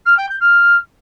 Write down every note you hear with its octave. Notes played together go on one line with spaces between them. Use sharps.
F6
G5
G6
F6